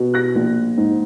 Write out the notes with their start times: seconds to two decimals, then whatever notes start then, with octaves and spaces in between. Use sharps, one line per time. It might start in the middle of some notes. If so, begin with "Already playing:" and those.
Already playing: B2
0.14 F#6 A#6
0.35 A#1
0.78 G#2